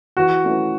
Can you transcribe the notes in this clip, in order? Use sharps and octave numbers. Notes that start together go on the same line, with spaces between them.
E3 F#4
A3 C#4 E4 B4